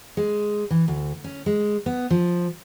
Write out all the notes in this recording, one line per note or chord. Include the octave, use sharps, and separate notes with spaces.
G#3
E3
D2
C#4
G#3
B3
F3